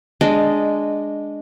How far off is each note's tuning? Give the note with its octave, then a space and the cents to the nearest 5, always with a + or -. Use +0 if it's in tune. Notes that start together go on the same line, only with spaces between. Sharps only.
G#3 +0 D4 +0 D#5 -10